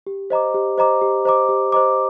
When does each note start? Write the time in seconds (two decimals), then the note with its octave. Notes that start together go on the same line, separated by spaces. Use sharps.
0.07 G4
0.30 C5 D#5 A#5 D6
0.54 G4
0.78 C5 D#5 A#5 D6
1.02 G4
1.25 C5 D#5 A#5 D6
1.49 G4
1.72 C5 D#5 A#5 D6